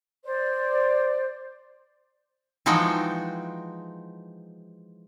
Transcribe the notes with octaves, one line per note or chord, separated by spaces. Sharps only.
C5 D5
E3 F3 G#3 D#4 F#4 G5